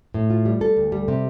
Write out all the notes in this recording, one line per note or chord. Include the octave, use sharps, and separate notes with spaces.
A2
F4
G3
A4
D2
G3
C3